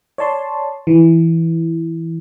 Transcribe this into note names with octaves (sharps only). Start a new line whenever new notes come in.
C#5 D5 A5 C6
E3